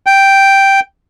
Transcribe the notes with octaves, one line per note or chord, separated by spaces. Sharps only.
G5